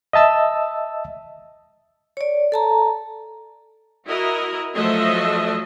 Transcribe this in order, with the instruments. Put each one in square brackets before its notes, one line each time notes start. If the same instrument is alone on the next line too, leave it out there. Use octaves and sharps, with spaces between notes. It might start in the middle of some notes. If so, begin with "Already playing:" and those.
[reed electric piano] D#5 E5 A5 E6
[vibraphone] C#5 D5
A4 A5 A#5
[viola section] E4 F#4 A#4 D#5
F3 F#3 A3 A4 D#5 E5